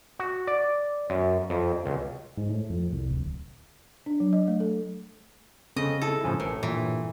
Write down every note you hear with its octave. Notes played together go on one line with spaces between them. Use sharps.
F#4
D5
F#2
F2
C#2
G#2
A2
F2
C2
D1
D4
F#3
D#5
A3
A4
C#3 C4 A4 D#5
D#4 E4 G#4 A4
A2 C#3 F3 G#5
A1 A2 A#4 C#5
G2 A#2 E3